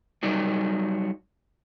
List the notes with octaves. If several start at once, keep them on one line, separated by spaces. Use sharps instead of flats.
F#3 G3 D#4 D5